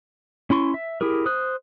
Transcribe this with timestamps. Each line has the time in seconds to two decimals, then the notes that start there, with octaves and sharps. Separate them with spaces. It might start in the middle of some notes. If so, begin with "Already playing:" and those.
0.50 C#4 E4 C6 C#6
0.74 E5
1.01 E4 G4 G#4 A#4
1.26 C5 D#6 F#6